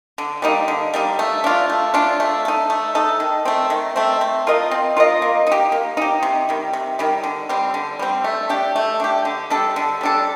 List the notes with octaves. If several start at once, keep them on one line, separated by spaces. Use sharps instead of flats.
D3
G3 A#3 D#4
D3
G3 A#3 D#4
A3
D4 F4
A3
D4 F4
A3
D#4 A4
A3
D#4 A4
D#3
A3 C4
D#3
A3 C4
C4
F4 A#4 D#5
C4
F4 A#4 D#5
A#3
D#4 G4
A#3
D#4 G4
C3
D#3 G3
C3
D#3 G3
D3
G3 C4
D3
G3 C4
A3
D4 G4
A3
D4 G4
D3
G3 D4 A4
D3
G3 D4 A4